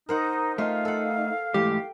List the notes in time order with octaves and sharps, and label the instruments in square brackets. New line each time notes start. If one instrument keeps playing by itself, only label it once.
[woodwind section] D#4 [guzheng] A#4 C5 F#5
[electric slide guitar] A3 D#4 [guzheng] F4 [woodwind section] F5
[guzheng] A4 F#5
[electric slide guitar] G#2 E3 A3 [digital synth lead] G4 [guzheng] G5